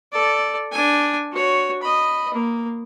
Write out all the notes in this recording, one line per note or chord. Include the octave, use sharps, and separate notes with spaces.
A4 D5
D4 G#5
F#4 C#5
D#5 B5
A#3